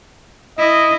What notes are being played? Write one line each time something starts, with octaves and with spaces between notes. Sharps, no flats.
E4 D#5